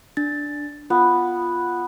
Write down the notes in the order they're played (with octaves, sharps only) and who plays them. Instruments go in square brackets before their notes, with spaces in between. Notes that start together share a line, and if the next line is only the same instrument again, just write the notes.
[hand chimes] D4 A6
[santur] B3 [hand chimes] F4